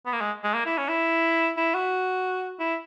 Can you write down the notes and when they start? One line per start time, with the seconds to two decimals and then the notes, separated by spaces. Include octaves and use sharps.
0.06 B3
0.13 A#3
0.21 G#3
0.43 G#3
0.54 A#3
0.66 E4
0.78 C#4
0.88 E4
1.57 E4
1.74 F#4
2.60 E4